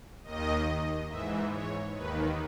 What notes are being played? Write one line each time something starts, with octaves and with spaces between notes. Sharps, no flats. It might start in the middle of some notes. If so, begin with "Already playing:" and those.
D#2 D#3 D#5
G#2 E3 E5
C#5
D#2 D#3 B4